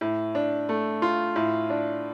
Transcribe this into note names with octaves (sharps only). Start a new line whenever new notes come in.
A2
D4
A3
F4
A2
D4